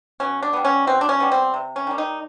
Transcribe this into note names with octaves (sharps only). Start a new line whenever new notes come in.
B2 C#4
D4
G3 B3
C#4
B2 C4
D4
C#4
G3 B3
C4
C3
C#4
D#3 G3
D#4